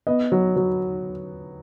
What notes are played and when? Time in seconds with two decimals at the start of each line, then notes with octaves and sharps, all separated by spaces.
0.07 B3 D#5
0.32 F#3
0.56 F#3